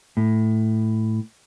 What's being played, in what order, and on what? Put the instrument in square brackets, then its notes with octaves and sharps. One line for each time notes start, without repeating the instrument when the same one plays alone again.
[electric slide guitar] A2